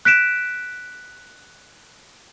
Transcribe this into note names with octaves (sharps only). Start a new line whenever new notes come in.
F#6 B6 D7 E7